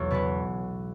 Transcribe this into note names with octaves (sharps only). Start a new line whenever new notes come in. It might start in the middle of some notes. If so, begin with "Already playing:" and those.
Already playing: B1 E2 C#5
B2 G#3 B4